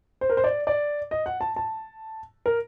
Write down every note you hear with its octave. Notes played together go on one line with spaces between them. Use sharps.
C5
A#4
C5
D5
D5
D#5
F#5
A5
A5
A#4